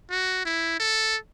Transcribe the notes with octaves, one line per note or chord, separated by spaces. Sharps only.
F#4
E4
A4